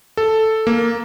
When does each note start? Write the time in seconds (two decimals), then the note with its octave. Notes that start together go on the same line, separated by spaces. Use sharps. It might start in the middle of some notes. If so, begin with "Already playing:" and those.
0.17 A4
0.67 A#3